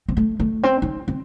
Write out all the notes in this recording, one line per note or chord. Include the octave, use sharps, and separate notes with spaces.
C4
A3
A3
C4
D#4
C4